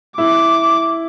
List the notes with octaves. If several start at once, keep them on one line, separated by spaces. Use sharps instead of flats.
E4 D6